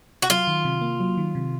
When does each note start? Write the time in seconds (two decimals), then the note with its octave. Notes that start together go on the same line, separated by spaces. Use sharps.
0.22 F#4
0.30 F#3 F4
0.47 D#3
0.65 C3
0.81 A#3
1.00 F#3
1.17 D#3
1.35 C3